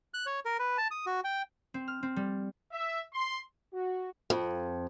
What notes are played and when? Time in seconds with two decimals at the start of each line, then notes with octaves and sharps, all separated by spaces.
0.14 F#6
0.26 C#5
0.45 A#4
0.59 B4
0.78 A5
0.91 D#6
1.06 F#4
1.24 G5
1.74 C4
1.88 F6
2.03 C4
2.16 G3
2.72 E5
3.13 C6
3.73 F#4
4.30 F2